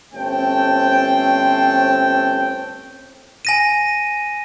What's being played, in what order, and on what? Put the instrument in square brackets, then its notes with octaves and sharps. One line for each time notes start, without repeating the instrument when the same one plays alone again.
[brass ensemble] G1 A3 C4 C#4 G5 A5
[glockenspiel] G#5 A#6 D#7